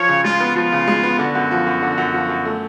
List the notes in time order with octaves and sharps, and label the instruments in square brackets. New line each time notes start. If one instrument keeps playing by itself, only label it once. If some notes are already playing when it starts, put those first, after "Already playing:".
Already playing: [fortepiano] F3 [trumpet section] C#5
[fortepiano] C#3
[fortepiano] G#3 [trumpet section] F4
[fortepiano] B3
[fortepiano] F3 [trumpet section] F4
[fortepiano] C#3
G#3
B3
[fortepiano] D3 [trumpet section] F#4
[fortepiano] F#2
F3
F#2
D3
F#2
F3
F#2
A3